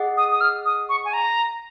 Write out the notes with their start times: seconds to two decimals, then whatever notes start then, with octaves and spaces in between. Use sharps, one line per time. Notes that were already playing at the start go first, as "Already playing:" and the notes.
Already playing: G#4 D#5 F#5
0.17 D#6
0.32 D#6
0.41 F6
0.66 D#6
0.89 C#6
1.05 G#5
1.13 A#5